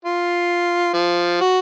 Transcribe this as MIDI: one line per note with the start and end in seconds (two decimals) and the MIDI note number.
0.05 0.91 65
0.94 1.38 53
1.41 1.59 66